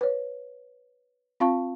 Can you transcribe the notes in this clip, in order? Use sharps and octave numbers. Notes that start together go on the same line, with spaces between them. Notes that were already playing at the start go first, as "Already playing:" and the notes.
B4 C#5
C4 F4 F5 A5 C#6